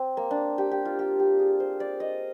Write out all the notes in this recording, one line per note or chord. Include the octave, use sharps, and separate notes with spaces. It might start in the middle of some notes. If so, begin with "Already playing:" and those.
Already playing: C4
A#3
D4
G4
G4
F4
G4
G4
G#4
C5
D5
D#5